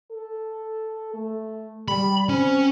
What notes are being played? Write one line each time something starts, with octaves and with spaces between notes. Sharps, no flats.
A4
A3
G3 B5
C4 C#4